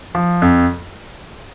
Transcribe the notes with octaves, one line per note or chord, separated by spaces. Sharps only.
F3
F2